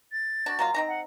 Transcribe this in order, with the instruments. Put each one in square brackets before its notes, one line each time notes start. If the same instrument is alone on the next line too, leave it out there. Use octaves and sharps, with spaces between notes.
[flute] A6
[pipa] D4 F#4
F#3 A#3 F4
C4 D#4 A#5
[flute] F#5